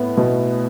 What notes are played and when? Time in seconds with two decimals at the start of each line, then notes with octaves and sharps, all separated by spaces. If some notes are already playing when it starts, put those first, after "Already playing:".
Already playing: A2 B3
0.17 B2